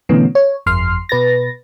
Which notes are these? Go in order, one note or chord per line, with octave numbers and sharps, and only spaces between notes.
B2 D3 E3 A3 B3 C#4
C#5
G1 F2 C6 F6 C7
B2 B4 A6 A#6